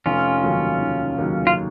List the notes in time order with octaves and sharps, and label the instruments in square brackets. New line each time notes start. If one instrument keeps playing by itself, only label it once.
[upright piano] F1 [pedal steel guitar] C#4 F4
[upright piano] D#2 C#3 F#3
F1
D#2 C#3 F#3
[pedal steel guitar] F4